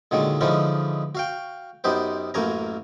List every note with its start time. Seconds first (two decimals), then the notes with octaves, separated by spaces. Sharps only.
0.11 A#2 D3 D#3 F#3 G#3
0.41 D3 E3 F3 G#3 C#4 D#4
1.15 F#4 F5 G5
1.84 F#2 B3 D#4 G4 C5
2.34 A1 F#2 A#3 C#5 G#5 A#5